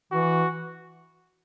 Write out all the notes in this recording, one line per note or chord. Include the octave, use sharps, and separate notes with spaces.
E3 F#4